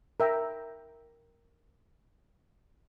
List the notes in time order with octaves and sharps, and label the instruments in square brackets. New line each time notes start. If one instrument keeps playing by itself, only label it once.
[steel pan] A#4 E5 G5 A#5